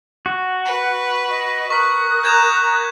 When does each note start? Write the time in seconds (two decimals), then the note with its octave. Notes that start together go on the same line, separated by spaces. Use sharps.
0.26 F#4
0.65 B4
1.27 D#5
1.70 A#4 C#6 D#6 F#6 B6
2.24 A#5 G6 G#6 E7